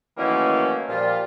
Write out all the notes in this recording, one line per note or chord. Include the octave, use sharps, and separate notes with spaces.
D#3 E3 F#3 A3 A#3 C#4
A#2 F3 G3 F4